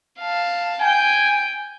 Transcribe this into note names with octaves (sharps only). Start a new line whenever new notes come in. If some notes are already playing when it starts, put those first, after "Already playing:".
F5 A5
G5 G#5 G6